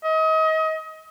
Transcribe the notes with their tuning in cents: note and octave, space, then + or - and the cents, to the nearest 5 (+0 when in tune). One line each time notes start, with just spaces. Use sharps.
D#5 +35